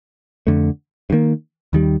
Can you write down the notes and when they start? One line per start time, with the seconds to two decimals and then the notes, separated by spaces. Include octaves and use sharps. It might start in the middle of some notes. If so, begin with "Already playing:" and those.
0.47 F2 D3 A3
1.10 G2
1.12 D#3 A#3
1.73 D#2 D#3 G3